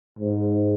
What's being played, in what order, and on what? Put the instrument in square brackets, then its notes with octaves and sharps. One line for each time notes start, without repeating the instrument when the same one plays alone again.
[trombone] G#2